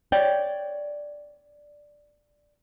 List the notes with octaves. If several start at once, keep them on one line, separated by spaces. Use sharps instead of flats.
C#5 D5 G5